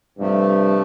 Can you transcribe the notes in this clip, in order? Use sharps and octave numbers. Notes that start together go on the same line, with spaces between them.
G2 C3 F3 A3